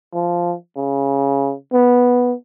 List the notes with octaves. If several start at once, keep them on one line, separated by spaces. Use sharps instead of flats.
F3
C#3
B3